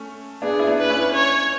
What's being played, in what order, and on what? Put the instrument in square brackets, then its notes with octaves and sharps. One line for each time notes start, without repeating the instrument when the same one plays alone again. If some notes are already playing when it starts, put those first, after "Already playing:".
Already playing: [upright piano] A3 C#4
[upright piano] B3 D4 [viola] G#4
[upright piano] E4
B3 D4
[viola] B4
[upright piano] C#4 E4
[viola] C#5